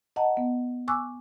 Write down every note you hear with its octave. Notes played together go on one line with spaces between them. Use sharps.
D#5 F#5 A5 A#5
B3
G#5 C#6 D6 E6 F#6